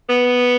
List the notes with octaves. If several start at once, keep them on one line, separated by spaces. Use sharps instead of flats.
B3